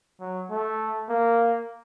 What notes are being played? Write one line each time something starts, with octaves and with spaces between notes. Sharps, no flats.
F#3
A3
A#3